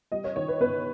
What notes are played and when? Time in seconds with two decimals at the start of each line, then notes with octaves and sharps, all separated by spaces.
0.12 G3 D#5
0.24 C#5
0.36 D#3 C#5
0.48 B4
0.60 G1 B4